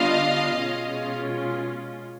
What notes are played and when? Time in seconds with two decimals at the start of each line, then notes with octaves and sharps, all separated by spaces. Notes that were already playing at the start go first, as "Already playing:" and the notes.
Already playing: D3 G3 B3 D4 F4 D#5 F5
0.56 B2 G#3 C#4 F4